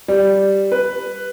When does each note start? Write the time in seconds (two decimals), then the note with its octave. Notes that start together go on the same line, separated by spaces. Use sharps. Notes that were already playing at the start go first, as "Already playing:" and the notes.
0.08 G3
0.72 B4